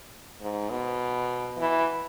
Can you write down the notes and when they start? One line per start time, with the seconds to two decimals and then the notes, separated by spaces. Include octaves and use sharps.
0.41 G#2
0.70 B2
1.58 E3